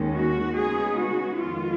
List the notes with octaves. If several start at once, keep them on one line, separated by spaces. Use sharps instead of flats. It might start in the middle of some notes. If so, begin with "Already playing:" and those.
Already playing: D#2 D#3 G#3 C#4
F#4
C#3 G#3 B3 D#4 G#4
F#4
F2 D#3 G#3 B3 F4